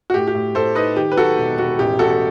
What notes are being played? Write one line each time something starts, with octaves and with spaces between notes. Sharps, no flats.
F#4
A2 G4
G4
A2
A2 A4 C5
D#4 B4 D#5
D#3 G4
B4
F#3 F#4 A4
E1
E1 F#4
A1 G4
A1 F#4 A4
A4